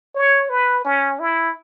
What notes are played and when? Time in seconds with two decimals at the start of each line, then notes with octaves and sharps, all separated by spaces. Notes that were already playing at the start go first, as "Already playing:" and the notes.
0.15 C#5
0.50 B4
0.85 C#4
1.20 E4